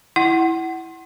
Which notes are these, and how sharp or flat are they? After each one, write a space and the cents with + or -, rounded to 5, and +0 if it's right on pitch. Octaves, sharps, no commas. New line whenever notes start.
E4 +0 F#5 +20